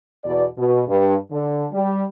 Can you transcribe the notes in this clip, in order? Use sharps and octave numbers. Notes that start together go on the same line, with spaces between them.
E2 B2 D5
B2
G2
D3
G3